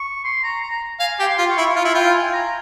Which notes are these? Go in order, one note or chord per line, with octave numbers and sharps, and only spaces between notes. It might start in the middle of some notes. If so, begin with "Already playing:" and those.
Already playing: C#6
C6
A#5
A#5
F5 G#5
G4
C6
F4
C#6
E4
F4 F5
E4
F4 G5
G#5
A#5